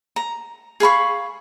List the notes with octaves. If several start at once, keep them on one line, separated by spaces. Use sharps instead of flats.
A#5
G#4 F5 B5 C#6